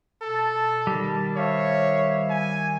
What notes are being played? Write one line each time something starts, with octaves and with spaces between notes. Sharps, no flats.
B2 A4 A5
D#3 G3
C5 C#5 E5 F5
G#5